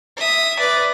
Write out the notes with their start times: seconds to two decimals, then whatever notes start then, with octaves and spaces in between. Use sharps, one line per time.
0.17 E5 D#6
0.59 B4 D5